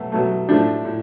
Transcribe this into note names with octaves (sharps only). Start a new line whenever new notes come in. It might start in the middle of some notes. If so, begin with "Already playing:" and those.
Already playing: B2 F#3 A3
B2 F#3 A3
A2 F3 A3 D4
A2